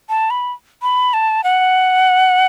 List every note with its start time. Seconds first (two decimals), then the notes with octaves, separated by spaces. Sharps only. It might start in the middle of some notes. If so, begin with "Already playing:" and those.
0.09 A5
0.30 B5
0.82 B5
1.14 A5
1.44 F#5